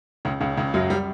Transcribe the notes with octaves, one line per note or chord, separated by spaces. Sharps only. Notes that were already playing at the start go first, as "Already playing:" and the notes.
C#2 C#3
C#2 C#3
C#2 C#3
F#2 F#3
G3